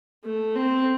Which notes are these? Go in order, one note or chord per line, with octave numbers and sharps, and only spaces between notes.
A3
C4